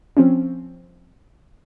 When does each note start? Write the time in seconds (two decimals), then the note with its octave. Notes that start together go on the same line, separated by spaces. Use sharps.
0.17 F3 C4 C#4